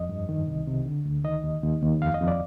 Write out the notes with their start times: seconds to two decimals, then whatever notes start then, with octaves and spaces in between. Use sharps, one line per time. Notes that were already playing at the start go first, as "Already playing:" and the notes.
Already playing: F2 D#5
0.09 G2
0.29 D#3
0.48 C2
0.67 C3
0.86 D3
1.05 D2
1.24 D#3 D#5
1.44 D#2
1.63 D#2
1.83 D#2
2.01 F2 F5
2.14 D#5
2.21 F2
2.28 D5